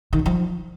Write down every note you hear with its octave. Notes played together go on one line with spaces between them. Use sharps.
D#3
F#2
F3